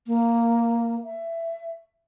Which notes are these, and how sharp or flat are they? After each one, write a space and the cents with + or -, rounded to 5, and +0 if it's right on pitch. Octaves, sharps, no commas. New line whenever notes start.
A#3 -5
E5 +20